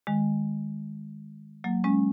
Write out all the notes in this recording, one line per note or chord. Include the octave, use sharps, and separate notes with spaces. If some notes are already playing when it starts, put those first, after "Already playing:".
D#3 G#3
F#3 A#3
G#3 C#4